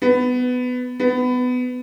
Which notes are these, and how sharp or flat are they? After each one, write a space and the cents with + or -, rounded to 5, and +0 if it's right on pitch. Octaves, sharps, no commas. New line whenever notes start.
B3 +15
B3 +20